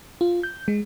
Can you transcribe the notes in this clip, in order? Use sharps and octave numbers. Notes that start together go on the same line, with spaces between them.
F4
G6
G#3